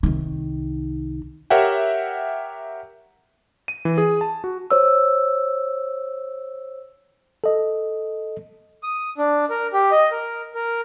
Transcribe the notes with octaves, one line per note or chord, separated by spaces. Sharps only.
C2 D#3
G4 A#4 C#5 E5 F#5 G5
D#7
E3
G#4
A5
F#4
C5 C#5 E6
A4 D#5
D#6
D4
A#4
G4
D#5
A#4
A#4